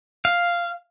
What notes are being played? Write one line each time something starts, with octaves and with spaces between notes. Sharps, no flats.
F5